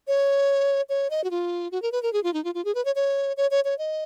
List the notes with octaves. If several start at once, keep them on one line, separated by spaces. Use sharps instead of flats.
C#5
C#5
D#5
F#4
F4
F#4
A#4
B4
A#4
G#4
F4
D#4
F4
F4
G#4
B4
C#5
C#5
C#5
C#5
C#5
D#5